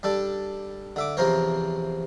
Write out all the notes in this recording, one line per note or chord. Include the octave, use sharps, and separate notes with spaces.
G3 D4 A4 D5
D3 E5 D6
E2 C3 F3 A#4 C5 C#5